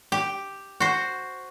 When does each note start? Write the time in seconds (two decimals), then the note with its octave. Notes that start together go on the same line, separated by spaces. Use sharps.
0.12 G4
0.80 F#4 C5